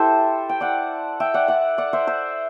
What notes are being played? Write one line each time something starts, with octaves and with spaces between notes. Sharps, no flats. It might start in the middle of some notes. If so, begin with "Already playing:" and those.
Already playing: E4 G4 A4 C5 E5
G5
D5 F#5
E5 G5
D5 F#5
D5 F#5
D5 F#5
C5 E5
C5 E5